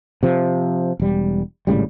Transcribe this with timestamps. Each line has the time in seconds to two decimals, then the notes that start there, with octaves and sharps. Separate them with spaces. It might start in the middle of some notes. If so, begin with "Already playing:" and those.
0.23 C3 F3
1.00 E1 G3
1.67 G#1 A2 C#3 G3